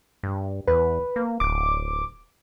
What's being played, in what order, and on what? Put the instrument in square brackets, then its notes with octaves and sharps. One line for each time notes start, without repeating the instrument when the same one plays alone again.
[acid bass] G2
[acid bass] E2 [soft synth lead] B4
[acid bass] A#3
[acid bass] D1 [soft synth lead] D6